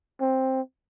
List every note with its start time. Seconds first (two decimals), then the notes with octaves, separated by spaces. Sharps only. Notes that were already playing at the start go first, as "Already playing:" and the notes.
0.20 C4